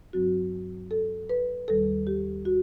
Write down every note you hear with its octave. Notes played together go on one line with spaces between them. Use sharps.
G2 F#3 C4 F#4
A4
B4
D#2 D#3 G3 A4
G4
F#4